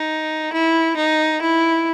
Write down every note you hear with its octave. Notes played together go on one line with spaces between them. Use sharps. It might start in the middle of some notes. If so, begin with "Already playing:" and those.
Already playing: D#4
E4
D#4
E4